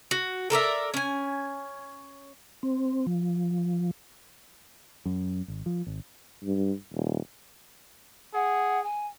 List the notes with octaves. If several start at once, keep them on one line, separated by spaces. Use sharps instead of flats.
F#4
A4 A#4 D5 E5
C#4 G#5
C4
F3
F#2
G#1
F3
G#1
G2
D#1
G#4 F#5
G#5